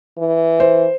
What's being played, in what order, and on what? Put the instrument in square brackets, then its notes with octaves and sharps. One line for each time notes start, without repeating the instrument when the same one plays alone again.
[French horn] E3
[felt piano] C5